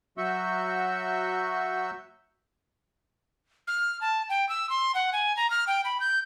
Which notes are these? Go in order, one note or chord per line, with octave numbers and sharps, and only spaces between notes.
F#3 F#4 E5 C#6 E6 G6
F6
A5
G5
E6
C6
F#5
G#5
A#5
F6
G5
B5
G6